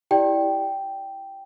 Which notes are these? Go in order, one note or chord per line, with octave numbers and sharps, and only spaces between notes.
E4 G4 D5 G5